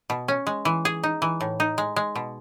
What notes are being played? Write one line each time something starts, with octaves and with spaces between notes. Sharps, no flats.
B2
C#4
G#3
E3
G#4
D#4
E3
A2
D#4
G#3
G#3
B2